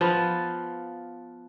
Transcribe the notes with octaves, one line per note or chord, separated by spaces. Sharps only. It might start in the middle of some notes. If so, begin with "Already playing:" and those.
F3 B3 F4